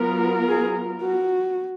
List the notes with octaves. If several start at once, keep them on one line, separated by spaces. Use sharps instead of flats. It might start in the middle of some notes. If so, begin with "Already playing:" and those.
Already playing: F#3 B3 F4 A#4
G#4
F#4